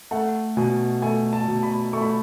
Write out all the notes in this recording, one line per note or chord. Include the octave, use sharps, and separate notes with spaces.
A3 F#5
B2 G#5
A3 G#5
A5
B2
B5
A3 C#6
B5